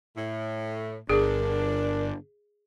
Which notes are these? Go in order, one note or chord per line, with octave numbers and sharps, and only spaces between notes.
A2
G1 D4 G#4 A#4